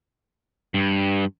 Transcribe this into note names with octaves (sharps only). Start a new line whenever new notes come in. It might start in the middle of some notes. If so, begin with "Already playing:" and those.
G2